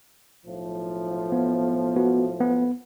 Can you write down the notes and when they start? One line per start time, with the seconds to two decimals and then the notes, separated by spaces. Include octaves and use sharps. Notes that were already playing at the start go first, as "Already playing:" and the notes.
0.45 B1 A2 F3
1.32 B3
1.96 B3 F#4
2.40 B3